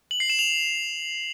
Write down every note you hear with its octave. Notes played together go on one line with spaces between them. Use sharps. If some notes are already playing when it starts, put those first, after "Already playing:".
F#7
C7
E7
F7